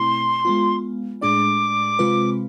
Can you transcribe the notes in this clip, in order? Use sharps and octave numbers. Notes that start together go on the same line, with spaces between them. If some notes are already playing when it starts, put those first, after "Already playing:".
Already playing: B2 A3 C4 E4 C6
G#3 B3 F4
A2 G#3 D4 G#4 D5 D6
C3 G#3 C4 F4 B4